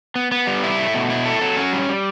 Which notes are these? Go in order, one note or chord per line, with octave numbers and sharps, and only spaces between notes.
B3
B3
G3
E4
A3
B2
E4
A4
F#3
C#4
G3
G3